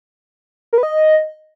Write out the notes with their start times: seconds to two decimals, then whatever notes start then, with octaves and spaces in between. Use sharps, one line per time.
0.73 A#4
0.78 B4
0.83 D#5